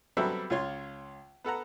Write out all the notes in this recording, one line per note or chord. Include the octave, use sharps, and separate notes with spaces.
F#3 G3 B3 C4 A4 E5
C#2 F4 C#5 C6
B3 A4 F#5 A#5